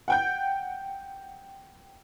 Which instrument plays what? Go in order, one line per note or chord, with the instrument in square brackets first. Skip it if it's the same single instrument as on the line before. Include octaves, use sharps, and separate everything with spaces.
[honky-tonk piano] F#5 G5 G6